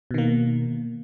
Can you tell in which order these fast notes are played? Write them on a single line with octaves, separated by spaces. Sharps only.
B2 D#3 A#3